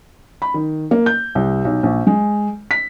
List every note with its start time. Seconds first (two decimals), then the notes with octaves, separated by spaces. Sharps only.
0.42 B5
0.54 D#3
0.91 A#3
1.06 G6
1.35 C2
1.65 B1
1.83 A#1
2.07 G#3
2.71 B6